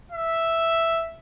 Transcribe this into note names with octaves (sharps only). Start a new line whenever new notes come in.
E5